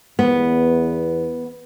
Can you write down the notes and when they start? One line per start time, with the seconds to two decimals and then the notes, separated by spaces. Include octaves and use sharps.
0.19 E2 B3